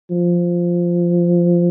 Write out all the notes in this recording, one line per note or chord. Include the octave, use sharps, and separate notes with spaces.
F3